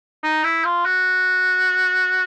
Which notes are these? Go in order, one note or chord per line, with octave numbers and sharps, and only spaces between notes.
D#4
E4
F4
F#4